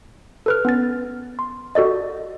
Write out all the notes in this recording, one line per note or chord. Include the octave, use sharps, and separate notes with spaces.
A4 B4 F6
B3 C#4 A6
C6
F#4 A4 D5 D#5